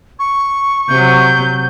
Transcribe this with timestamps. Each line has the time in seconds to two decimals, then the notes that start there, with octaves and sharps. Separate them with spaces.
0.19 C#6
0.88 C3 F#3 G6